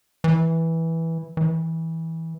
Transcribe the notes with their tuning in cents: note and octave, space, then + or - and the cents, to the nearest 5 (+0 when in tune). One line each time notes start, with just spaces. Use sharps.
E3 -10
E3 -20